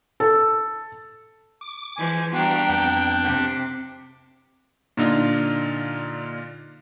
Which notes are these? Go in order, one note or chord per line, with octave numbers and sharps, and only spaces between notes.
A4
D6
E3 F3 G#3 G#5
G3 B3 D4 F#4 F5 G5 A#5
F2 B3 G6
C3
A#2 D3 D#4 F4